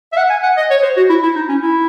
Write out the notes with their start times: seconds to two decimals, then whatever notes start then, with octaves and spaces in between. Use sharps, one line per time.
0.12 E5
0.17 F#5
0.30 G#5
0.43 F#5
0.57 D#5
0.70 C#5
0.83 C5
0.97 F#4
1.10 E4
1.23 E4
1.36 D#4
1.49 C#4
1.62 E4